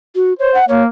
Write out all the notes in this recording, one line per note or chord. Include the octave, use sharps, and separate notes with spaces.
F#4
C5 C#5
F#5
A#3 C#5